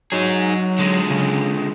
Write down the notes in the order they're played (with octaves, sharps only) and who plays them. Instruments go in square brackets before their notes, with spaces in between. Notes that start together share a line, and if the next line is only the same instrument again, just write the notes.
[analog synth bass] F#3 [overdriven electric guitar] D#4 G#4
[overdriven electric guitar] D3 G#3
[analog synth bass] C#3